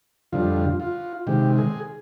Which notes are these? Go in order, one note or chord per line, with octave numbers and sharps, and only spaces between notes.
F2 D3 G3 F4
F4
C3 D#3 G#3 G4
G#4